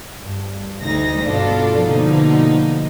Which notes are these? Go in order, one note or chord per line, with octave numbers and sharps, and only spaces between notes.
G2
D2 D#4 A#6
G2 B2 D4 F4 A4
B2 D3 F3 A#3 D#4